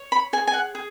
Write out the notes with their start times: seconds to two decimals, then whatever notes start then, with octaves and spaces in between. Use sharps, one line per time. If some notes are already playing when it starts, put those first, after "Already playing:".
Already playing: C#5
0.12 B5
0.33 G#4 G#5
0.47 G#5
0.53 F#5
0.75 G#4